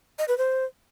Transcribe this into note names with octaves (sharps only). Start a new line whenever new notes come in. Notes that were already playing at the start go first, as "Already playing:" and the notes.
D#5
B4
C5